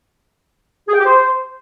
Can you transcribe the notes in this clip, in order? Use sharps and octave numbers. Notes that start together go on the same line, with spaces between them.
G#4
G5
G4
C5